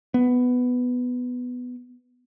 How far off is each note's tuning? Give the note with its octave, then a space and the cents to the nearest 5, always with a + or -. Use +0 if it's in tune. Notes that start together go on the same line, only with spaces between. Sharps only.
B3 +5